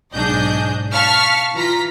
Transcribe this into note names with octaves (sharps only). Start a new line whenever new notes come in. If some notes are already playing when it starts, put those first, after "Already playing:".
B1 G#2 D4 G#4 D#5 G6
F5 A5 C#6 F6 B6
E3 F4 A#5 B6